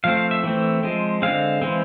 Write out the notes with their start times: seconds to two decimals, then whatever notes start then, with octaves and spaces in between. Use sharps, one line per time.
0.04 F3 A3 C4 F5
0.17 F5
0.31 E5
0.44 E3 A3 C4
0.83 F3 G#3 C4
1.22 D3 G#3 C4 F5
1.62 E3 G#3 C4